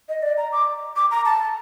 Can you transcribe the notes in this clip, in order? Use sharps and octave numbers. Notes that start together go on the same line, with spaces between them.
D#5
D5
A#5
D6
D6
A#5
A5